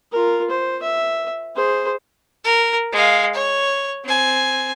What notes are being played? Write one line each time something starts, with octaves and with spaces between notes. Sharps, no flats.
F4 A#4
C5
E5
G#4 C5
A#4
G#3 F5
C#5
C4 G#5